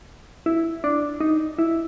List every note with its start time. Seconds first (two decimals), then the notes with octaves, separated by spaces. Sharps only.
0.46 E4
0.84 D4
1.21 D#4
1.59 E4